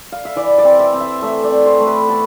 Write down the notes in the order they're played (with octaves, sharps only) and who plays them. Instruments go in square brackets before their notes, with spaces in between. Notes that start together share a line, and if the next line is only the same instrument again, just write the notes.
[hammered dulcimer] F5
E5
E3 D5
D5
C4
E5
C4
E5
A3 E5
D5
C4
C5
A3
B4
B3 A4